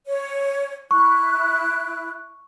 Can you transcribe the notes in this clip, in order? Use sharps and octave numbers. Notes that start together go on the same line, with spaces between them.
C#5
E4 C#6 F#6